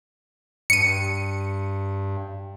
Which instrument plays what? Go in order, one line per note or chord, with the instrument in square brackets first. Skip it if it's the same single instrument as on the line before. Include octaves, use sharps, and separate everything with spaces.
[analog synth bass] G2 [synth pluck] C#7 D#7